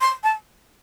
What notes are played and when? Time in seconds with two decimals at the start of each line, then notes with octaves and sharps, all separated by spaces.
0.01 C6
0.23 A5